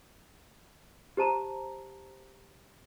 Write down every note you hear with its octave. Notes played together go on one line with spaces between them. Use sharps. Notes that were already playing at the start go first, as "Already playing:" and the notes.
G4 C5 A5 A#5